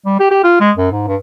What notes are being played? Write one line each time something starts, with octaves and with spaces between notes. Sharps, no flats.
G3
G4
G4
F4
G#3
F#2
G#2
G2